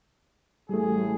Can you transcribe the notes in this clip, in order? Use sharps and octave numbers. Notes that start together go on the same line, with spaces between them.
A1 A2 G3 A3 G#4